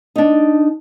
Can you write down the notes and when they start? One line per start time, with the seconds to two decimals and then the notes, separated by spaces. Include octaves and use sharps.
0.16 D4 D#4